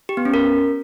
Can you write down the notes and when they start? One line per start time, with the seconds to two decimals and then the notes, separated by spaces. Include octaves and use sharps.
0.09 G4
0.17 B3
0.25 C#4
0.34 A#4